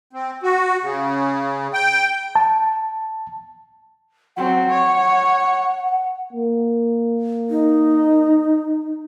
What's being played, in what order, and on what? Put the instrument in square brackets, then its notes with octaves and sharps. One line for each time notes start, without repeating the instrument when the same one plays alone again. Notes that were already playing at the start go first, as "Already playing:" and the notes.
[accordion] C4
F#4
C#3
G5
[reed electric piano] A5
[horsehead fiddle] F#3 C4 [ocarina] F#5
[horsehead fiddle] C#5
[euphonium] A#3
[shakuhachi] D#4